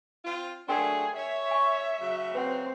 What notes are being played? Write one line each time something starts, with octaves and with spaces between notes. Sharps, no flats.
C4 F4
F#3 A3 D4 G#4 A#4 G5 C6
C#5 E5
G#5 C#6
C#3 F#3
C4 B4 F#5